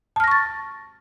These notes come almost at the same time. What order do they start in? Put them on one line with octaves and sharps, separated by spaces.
A5 F6 A#6 C#6 A6